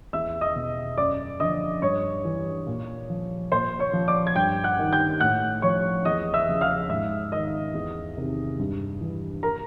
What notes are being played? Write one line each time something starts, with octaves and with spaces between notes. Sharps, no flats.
E2 E5 E6
D#5 D#6
B2
F#2 D5 D6
D3 F3 D#5 D#6
G2 C#5 C#6
E3
A#2
F3
A#2 C5 C6
C#5 C#6
F3
D5 D6
G#6
G2 G5 G6
F#5 F#6
D#3
G5 G6
A2 F#5 F#6
F3 C#5 C#6
E2 D#5 D#6
E5 E6
C#3 F3
F5 F6
G#2 E5 E6
D#3 D#5 D#6
E2
C3 D#3
G2
E3
A#4 A#5